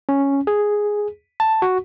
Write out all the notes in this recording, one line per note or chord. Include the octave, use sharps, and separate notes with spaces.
C#4
G#4
A5
F#4